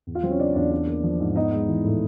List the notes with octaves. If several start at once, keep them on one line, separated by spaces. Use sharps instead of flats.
E2
F4 F5
F#3 C4 C5
C#4 C#5
C#3 D4 D5
E2 D4 D5
D4
A#3
F3
G#2
B3 D#4 D#5
G#3
E3
A2